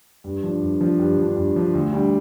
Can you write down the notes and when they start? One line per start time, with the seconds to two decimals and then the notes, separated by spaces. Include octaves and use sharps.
0.24 G2
0.43 F3 D4
0.62 G2
0.81 F3 D4
0.99 G2
1.18 F3 D4
1.37 G2
1.56 F3 D4
1.74 D2
1.93 D3 G3 D4